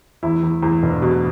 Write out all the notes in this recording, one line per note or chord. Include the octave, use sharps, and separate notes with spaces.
E2 E4
E2
E2
E1
B2